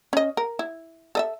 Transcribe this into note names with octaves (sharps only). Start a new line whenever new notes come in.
C#4 D#5
A#4
E4
A4 D#5 E5